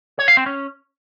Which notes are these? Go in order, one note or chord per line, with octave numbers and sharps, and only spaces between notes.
C#5
F5
C4
C#4